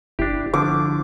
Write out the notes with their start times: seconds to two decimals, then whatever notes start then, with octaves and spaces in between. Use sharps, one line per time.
0.19 G1 D4 E4 G4
0.54 D3 F3 D6